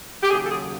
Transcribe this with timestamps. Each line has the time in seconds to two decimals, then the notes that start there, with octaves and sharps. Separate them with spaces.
0.23 G4
0.30 D#2 C#3 F#3 G#4
0.45 A4
0.50 G#4